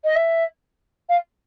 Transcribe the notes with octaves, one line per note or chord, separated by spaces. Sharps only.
D#5
E5
F5